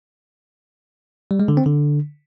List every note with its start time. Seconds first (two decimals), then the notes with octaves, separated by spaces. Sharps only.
1.31 G3
1.40 G#3
1.48 D3
1.57 C4
1.66 D3